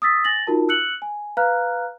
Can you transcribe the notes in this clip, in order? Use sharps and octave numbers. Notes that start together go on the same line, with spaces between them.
D#6 E6 A6 B6
G#5 A6 A#6 F#7
D#4 F4 F#4 A#4 A5
E6 F#6 C#7 F#7
G#5
B4 F5 A#5 F6 F#6